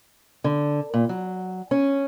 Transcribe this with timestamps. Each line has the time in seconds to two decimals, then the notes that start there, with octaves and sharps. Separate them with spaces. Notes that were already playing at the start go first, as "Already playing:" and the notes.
0.44 D3
0.94 A#2
1.09 F#3
1.71 C#4